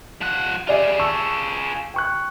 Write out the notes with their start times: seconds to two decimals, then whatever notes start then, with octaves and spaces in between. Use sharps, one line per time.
0.21 F3 F#5
0.67 F4 G4 G#4 D5 E5
0.99 A5 C#6 E6
1.94 G5 C#6 F#6